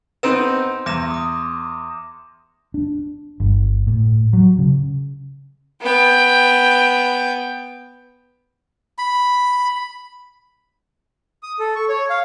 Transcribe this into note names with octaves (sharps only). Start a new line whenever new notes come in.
B3 C4 D#4 C6 E7
E2 D6 A#6 E7
D6 D#6
D4
G1
A2
F#3
C#3
B3 G5
B5
D#6
A4
C#6
C#5
F5